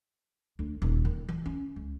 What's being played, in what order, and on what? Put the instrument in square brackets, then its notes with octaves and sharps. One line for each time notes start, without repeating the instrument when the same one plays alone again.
[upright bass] D2
D#1
D#3
E3
C#4
C#2